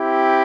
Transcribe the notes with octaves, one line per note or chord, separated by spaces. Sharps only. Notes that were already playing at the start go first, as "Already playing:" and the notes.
Already playing: C4 E4 G4